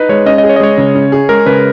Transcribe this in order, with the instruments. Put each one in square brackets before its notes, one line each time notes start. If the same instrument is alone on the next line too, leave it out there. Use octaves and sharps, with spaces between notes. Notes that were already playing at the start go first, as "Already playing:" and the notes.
Already playing: [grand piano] D#4 [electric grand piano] B4
[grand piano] G#3 [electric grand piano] C#5
[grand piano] C#4 [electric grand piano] D#5
[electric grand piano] D#5
[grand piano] G#4
[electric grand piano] C#5
D#5
[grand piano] G#3 [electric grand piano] C#5
[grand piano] C#3
C#4
G#4
[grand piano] G#3 [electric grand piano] A#4
[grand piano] C#3 [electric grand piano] B4